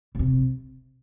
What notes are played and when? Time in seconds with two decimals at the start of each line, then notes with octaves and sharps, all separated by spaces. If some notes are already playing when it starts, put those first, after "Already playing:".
0.15 A#2
0.19 C3